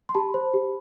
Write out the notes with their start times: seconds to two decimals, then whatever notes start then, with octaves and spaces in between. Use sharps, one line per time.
0.09 C6
0.14 G4 A5 B5
0.34 C5
0.54 G4